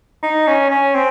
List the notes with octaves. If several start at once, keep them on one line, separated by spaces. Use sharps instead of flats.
D#4
C#4
C#4
C4